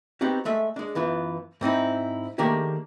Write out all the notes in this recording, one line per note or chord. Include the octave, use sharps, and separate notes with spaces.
B3 C4 D#4 F#4 G4
G#3 A3 E5
G#3 D4
F#2 E3 B3 F4
G#2 C4 D#4 E4
D#3 A3 A#3 D4 G4 G#4